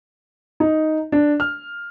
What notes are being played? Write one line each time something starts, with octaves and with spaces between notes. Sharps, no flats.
D#4
D4
F6